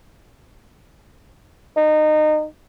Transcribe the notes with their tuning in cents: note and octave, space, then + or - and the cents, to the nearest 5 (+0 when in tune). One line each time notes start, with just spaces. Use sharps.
D#4 -25